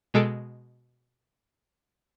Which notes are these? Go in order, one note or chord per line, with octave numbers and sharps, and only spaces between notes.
B2 G#3 A4 D7